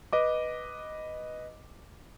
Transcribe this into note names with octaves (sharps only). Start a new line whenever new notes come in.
B4 D#5 D6